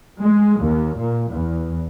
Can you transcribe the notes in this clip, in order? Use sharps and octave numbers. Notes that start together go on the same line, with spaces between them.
G#3
D#2
A#2
E2